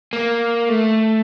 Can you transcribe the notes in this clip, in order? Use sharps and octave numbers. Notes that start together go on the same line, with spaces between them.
A#3
A3